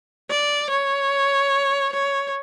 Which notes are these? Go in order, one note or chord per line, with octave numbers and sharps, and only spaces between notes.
D5
C#5
C#5